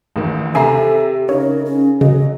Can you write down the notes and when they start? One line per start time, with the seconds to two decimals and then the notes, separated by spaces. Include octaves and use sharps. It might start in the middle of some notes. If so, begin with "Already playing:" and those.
0.16 A1 D#3
0.55 C3 G4 A4 E5 G#5 A#5 C7
1.29 C#3 D#4 A#4 C#5
1.65 C#4 G#4
2.01 C#3 F#3 D#5